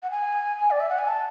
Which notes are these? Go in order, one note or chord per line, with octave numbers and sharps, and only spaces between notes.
F#5
G#5
D5
E5
F#5
G#5
A5